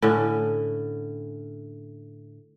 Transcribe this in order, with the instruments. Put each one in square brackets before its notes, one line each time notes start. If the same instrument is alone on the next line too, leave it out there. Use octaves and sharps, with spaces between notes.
[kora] A2 D3 C#4